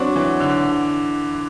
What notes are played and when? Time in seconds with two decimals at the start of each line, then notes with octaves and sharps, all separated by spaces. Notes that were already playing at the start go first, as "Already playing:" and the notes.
Already playing: F#3 C4 D4 F#4
0.16 E3
0.40 D3